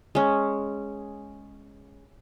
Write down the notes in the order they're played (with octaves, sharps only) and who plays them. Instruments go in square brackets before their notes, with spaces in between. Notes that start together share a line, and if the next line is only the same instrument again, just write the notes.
[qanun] G#3 C#4